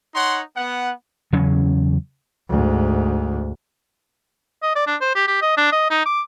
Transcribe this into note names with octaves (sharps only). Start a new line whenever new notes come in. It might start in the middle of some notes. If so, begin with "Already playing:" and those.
D#4 C#5 F#5 C6
B3 F#5
E2 C#3 F#3 C#4
D2 G#2
D#5
D5
D4
C5
G4
G4
D#5
D4
D#5
D#4
D6